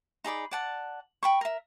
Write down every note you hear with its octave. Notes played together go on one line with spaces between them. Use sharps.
D#4 G#4 D5 B5
D5 F#5 A5
G5 B5 C#6
A#4 E5